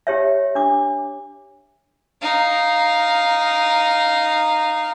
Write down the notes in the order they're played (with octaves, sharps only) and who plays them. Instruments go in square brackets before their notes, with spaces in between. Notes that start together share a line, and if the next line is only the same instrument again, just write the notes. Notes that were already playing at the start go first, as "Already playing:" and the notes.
[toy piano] G4 C#5 E5
D4 D6
[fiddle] D#4 F5